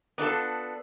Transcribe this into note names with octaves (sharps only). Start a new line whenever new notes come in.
B3 D4 F4 A4